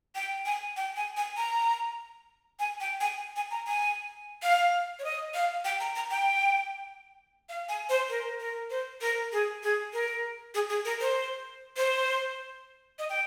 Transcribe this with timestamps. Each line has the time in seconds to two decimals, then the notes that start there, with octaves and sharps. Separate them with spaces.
0.15 G5
0.46 G#5
0.76 G5
0.96 G#5
1.17 G#5
1.37 A#5
2.59 G#5
2.80 G5
3.00 G#5
3.36 G#5
3.51 A#5
3.67 G#5
4.43 F5
4.99 C#5
5.04 D#5
5.34 F5
5.65 G5
5.80 A#5
5.96 A#5
6.11 G5
7.49 F5
7.69 G#5
7.89 C5
8.09 A#4
8.40 A#4
8.70 C5
9.01 A#4
9.32 G#4
9.63 G#4
9.93 A#4
10.54 G#4
10.69 G#4
10.85 A#4
11.01 C5
11.77 C5
12.99 D#5
13.09 G5